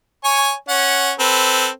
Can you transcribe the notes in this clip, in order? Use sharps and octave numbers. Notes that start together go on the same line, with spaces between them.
C#5 G#5 C#6
C#4 F#5
C4 A4 B4